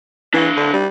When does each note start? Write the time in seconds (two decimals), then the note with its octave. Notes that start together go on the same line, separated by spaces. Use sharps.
0.34 E3 D4 F5
0.56 D3
0.73 G3